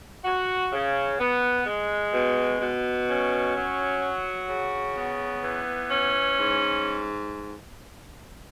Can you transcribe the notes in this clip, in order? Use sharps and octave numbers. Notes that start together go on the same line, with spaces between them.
F#4
C#3
B3
G#3
B2
B2
C#4
F#3
F#4
C#3
B3
E3
C#4
G#2